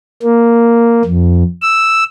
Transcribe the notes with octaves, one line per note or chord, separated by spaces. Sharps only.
A#3
F2
E6